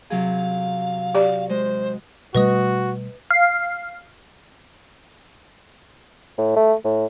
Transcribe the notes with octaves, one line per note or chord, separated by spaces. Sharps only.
C3 F#3 G#4 F5
F#4 G4 D5
G#3 C5
B2 G3 A3 F#4 B4 D#5 D#6
F5
A2
A3
A2